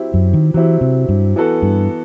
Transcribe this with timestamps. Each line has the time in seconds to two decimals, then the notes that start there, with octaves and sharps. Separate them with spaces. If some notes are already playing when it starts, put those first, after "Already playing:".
Already playing: F#3 C4 E4 G4
0.14 F#2
0.34 D#3
0.54 E3 F#3 C4 E4 G4
0.81 C3
1.09 G2
1.36 E3 B3 F#4 A4
1.62 G2